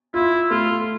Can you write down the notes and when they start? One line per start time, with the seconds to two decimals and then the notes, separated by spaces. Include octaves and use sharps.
0.14 E4 F4
0.50 A3 F4